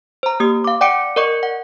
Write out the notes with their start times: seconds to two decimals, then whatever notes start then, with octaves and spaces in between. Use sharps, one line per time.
0.23 C5 A#5
0.40 A#3 G4 D#6
0.64 F5 D6
0.81 D5 F#5 G5 D6 C#7 D7
1.16 A#4 D5 D#5 C#6 C#7
1.43 F#5